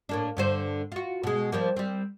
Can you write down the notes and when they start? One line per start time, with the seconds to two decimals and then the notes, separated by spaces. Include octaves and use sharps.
0.09 A2 A#3 D4
0.37 G2 D3 C5
0.92 F4 F#4
1.23 B2 G#3
1.52 F3 G3 A#3
1.77 G3 C4